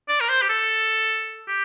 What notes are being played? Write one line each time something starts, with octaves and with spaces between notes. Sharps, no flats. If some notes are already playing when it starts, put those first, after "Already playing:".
D5
A#4
C5
G4
A4
G4